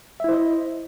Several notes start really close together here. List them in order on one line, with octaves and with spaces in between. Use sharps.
E5 E4 C5 D#5